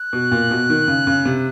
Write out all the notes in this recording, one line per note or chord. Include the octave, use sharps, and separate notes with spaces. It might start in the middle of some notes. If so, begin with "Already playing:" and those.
Already playing: F#6
B2
A#2
B2
D#3
C#3
C#3
C3